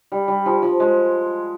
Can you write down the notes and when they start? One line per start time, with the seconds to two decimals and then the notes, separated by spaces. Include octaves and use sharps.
0.12 G3
0.28 G3
0.46 F3
0.62 F3
0.80 G#3